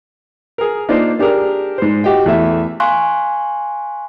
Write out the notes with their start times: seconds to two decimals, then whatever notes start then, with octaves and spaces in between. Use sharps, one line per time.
0.58 G#4 A#4
0.89 A#3 D4 D#4 F4 C5
1.19 D4 G4 G#4 A#4 D5
1.78 G#2 C5
2.04 F#4 G4 D#5 G5
2.26 E2 A3 E5
2.80 F5 G#5 C6 C#6 F#6